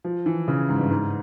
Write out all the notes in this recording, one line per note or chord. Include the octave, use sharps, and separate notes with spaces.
F3
E3
C#3
G#2
G2
G#2